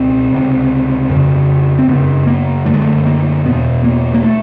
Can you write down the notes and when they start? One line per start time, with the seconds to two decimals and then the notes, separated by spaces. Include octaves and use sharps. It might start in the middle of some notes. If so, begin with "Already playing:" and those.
Already playing: C#2 B2 C4
0.31 C#2 C3
1.09 F2 C#3
1.79 C4
1.88 F#2 C#3 B3
2.27 A#3
2.66 F#2 D3 A3
2.74 G#3
2.81 A3
3.06 A#3
3.45 E2 B2 B3
3.84 A#3
4.14 A#3
4.24 A3